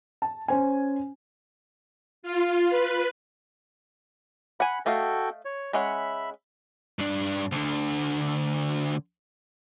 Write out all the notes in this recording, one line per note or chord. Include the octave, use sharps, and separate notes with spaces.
A5
C#4 C5 G#5
F4
B4
F#5 G#5 B5
A3 F#4 A4 D#5 F5 G5
C#5
G#3 C#4 E5 F#5 B5
G2 D4
D2 D3